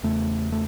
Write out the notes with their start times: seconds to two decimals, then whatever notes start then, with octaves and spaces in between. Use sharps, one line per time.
0.03 E2 C#3 A3
0.52 A3